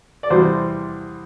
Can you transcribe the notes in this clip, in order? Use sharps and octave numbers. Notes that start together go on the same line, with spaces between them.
D5
E2 C3 G3 C5